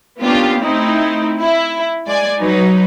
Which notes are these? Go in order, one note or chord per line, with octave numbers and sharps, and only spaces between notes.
A#3 B3 C#4 D4 F4 G4
A3 C4 D#4 E4
E4
G#3 D5 G#5
F#3 D#4 B4